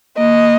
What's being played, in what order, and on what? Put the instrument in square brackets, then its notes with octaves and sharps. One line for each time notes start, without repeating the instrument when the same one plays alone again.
[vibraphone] A#3 [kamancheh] D#5